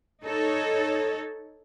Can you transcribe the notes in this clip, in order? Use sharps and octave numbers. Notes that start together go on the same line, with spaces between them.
D#4 A4 C#5